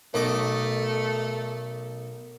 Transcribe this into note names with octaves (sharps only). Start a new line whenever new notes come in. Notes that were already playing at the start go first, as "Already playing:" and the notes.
B1 A3 A#4 D#5 D6